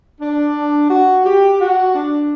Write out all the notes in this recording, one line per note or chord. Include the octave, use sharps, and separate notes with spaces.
D4
F#4
G4
F#4
D4